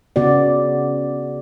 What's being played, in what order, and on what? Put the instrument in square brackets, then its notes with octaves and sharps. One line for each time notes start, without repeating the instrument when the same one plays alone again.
[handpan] C#3 B3 F#4 D5